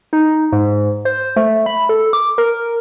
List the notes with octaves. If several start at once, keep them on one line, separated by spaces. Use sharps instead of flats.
D#4
G#2
C5
A3
B5
A4
D6
A#4